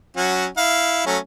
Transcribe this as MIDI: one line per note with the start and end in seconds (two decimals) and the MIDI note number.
0.17 0.47 54
0.17 0.47 61
0.17 0.47 66
0.57 1.02 64
0.57 1.02 77
1.06 1.18 54
1.06 1.18 57
1.06 1.18 61